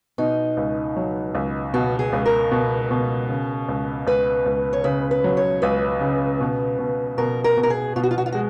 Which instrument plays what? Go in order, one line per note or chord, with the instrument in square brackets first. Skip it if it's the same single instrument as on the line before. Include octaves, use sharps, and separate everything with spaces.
[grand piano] B2 [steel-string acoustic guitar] D#4
[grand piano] C#2
F#3
C#2
[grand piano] B2 [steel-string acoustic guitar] F#4
[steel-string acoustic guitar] G#4
[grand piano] C#2
[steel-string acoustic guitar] A#4
[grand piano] B2
B2
C#3
C#2
[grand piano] C#2 [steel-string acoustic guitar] B4
[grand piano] C#2
[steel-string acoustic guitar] C#5
[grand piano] C#3 [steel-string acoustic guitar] B4
[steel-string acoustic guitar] B4
[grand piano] F#3
[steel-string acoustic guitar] C#5
[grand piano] C#2 [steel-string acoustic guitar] B4
[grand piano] C#3
B2
B2
[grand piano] B2 [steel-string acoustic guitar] A#4
[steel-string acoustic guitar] A#4
[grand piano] B2
[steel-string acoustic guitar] A#4
G#4
[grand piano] B2 [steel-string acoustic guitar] F4
[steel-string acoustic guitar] F#4
F4
F#4
F4
[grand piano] G#3 [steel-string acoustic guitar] F#4